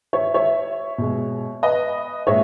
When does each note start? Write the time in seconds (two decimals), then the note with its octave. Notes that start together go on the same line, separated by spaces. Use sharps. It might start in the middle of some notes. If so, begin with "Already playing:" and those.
0.13 C#5 E5
0.34 C#5 E5
0.98 B2 G#3
1.63 B4 D#5
2.27 A#2 G#3 C#5 E5